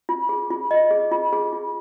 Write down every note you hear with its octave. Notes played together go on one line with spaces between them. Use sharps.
F4
G#4
F4
D#5
G#4
F4
G#4
F4